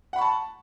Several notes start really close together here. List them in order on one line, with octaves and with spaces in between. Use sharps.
F#5 B5 C#6 A5